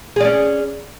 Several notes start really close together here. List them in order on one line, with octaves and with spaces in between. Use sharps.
G#4 D5 C#4